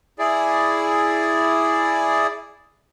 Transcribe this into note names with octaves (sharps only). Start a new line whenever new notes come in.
E4 G#4 D5